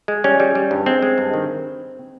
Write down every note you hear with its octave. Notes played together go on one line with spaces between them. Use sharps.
G#3
G3 C#4
G3
G3
G2
G#3 C4
G#3
G2
D#3